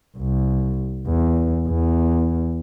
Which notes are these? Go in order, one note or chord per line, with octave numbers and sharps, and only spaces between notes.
C2
E2
E2